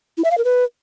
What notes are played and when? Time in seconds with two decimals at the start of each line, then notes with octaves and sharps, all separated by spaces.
0.18 E4
0.24 E5
0.31 F5
0.38 A#4
0.44 B4